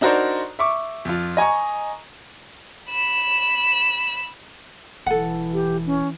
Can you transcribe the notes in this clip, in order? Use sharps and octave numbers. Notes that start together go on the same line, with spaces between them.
D4 D#4 F#4 A#4 C5 D5
E5 C#6 D6
F2 F4
D#5 G#5 A#5 C#6
B5 E7
E1 E3 A4 F#5
G4
C#4